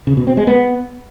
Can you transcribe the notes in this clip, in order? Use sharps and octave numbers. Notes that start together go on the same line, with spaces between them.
C#3
B2
C4
G#3
B3